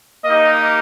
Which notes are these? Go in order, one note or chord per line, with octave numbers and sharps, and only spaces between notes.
A#3 D#4 G4 D#5